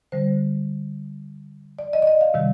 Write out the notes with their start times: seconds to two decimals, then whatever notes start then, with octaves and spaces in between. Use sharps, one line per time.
0.12 D3 G3 C5
1.79 D5
1.93 D#5
2.02 D5
2.07 D#5
2.21 F5
2.34 C3 D#3 G3